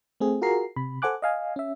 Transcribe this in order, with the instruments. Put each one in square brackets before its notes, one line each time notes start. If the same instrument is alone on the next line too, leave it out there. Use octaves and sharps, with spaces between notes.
[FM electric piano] A3 C4 G#4
F4 F#4 G#4 A#4 A#5 C7
C3 B5
A4 C5 F#5 G#5 D6 F#6
D#5 F5 G#5
C#4 E5